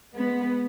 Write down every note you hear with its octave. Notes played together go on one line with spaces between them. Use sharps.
G#3 B3